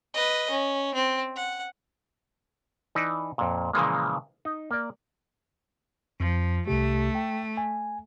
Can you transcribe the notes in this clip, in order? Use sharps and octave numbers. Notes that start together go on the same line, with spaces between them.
B4 D#5
C#4
C4
F#5
E3 D#4 B4 D5 A5
F2 A#2
A#2 C#3 E3 F3 G#3 A#3
D#4
A#3 D5
F2 F3
C2 C3 A3 G4
G5
G#5